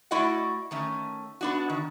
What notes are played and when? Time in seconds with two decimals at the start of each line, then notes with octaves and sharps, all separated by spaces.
0.11 A3 E4 F#4 D5 D#5 F#5
0.71 D#3 A3 C#4
1.41 B3 D4 F#4
1.70 D#3